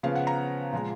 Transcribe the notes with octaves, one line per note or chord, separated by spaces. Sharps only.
C#3 F3 B3 F5
F#5
A#5
A#2 F3 G#3